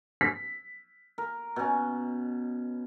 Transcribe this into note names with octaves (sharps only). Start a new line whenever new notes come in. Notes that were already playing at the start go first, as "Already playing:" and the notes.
B6
A#4
B2 C#4